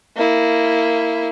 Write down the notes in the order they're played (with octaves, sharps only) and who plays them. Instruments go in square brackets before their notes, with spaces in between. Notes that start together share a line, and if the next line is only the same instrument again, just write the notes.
[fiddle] A#3 E4